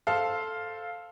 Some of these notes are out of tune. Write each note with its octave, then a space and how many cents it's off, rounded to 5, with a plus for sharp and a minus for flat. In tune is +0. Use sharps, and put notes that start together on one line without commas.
A4 +0 C5 +0 F5 +5